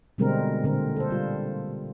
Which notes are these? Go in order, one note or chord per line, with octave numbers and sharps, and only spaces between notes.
B2 D3 G3 G#3 C4 A#4
A#2 D3 C4 A#4
A4 C5
G3 F4